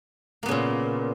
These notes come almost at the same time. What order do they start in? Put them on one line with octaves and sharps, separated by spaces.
A#3 B3 C#3 A#2